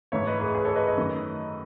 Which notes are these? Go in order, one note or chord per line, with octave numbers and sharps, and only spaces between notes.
G#2 E3 A3 C#5 E5
B4 D#5
G#4 B4
G#4 B4
A4 C#5
B4 D#5
B4 D#5
F#2 D#3 A3